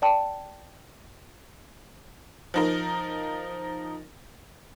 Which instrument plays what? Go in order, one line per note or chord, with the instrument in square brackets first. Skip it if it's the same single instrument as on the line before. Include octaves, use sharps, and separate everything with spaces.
[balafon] D5 G5 A5
[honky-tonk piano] F3 D#4 A#4